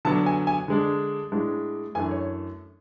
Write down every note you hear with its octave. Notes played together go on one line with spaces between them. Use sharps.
D3 F#3 B3 D4 A5
G#5
G#5
D3 G#3 D4
A2 G#3 D4
F#2 E3 A3 D4 G#5
C#5